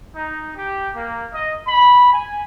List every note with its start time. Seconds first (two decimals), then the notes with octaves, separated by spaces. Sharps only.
0.14 D#4
0.55 G4
0.94 A#3
1.33 D#5
1.66 B5
2.12 G#5